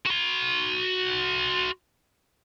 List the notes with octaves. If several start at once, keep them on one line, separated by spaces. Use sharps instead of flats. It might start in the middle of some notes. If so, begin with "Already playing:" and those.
F#4 C6